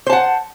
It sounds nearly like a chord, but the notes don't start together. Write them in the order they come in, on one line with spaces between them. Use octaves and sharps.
C5 A5 F#5